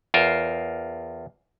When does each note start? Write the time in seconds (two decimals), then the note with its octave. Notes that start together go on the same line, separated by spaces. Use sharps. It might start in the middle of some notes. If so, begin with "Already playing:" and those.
0.14 E2 F4 A#4 C5